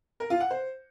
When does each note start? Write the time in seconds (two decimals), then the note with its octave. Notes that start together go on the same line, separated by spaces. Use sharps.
0.20 A#4
0.30 F4
0.40 F#5
0.51 C5